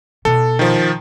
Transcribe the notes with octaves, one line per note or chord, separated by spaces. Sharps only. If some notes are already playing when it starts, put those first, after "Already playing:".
B2 A4
D#3 F3